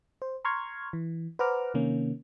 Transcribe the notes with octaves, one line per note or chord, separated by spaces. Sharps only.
C5
A#5 C6 C#6 F6 G#6
E3
B4 C5 F#5 A#5 D6 F6
C3 D#3 A#3 C#4